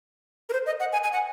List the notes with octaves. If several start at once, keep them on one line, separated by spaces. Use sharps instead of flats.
A#4
C5
D#5
F#5
G#5
G#5
F#5